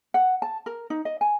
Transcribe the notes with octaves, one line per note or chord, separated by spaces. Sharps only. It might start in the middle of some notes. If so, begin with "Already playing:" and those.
F#5
A5
A#4
D#4
D#5
G#5